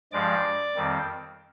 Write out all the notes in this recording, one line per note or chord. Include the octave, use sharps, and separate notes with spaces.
G2 F3 G#3 D5 D6
F2 D#3 G3 C4